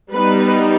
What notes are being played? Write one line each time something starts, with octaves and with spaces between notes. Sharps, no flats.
G3 B3 D#4 B4